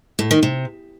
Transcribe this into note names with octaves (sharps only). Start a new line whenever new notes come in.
A2
D#3
C3